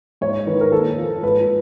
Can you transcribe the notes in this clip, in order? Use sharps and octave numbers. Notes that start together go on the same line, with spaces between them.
G#2 C#5
D#3 B4
A#4
A#2 A4
F3
G#2 B4